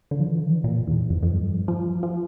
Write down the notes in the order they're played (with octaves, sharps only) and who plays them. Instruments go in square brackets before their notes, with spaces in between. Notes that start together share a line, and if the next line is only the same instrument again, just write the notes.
[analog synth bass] D3
F3
E3
D3
E3
A#2
E2
F2
F2
G2
F3
F3